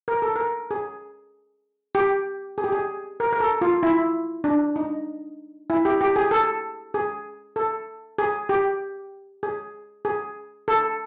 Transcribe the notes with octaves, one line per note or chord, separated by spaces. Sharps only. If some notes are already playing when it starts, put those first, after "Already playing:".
A#4
A4
A#4
G#4
G4
G#4
G4
G#4
A#4
A#4
A4
F4
E4
D4
D#4
E4
G4
G4
G#4
A4
G#4
A4
G#4
G4
G#4
G#4
A4